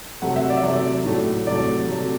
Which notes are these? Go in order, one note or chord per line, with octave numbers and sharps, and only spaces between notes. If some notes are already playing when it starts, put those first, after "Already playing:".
C3 F#3 A3 F#5
E5
D5
E5
C3 F#3 A3 D5
A2 F#3 A3
C3 F#3 A3 D5
C3 F#3 A3